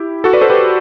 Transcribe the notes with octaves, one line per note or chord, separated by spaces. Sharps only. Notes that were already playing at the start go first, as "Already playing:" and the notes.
Already playing: E4 G4
F#4 A4
B4 D5
A4 C5
G4 B4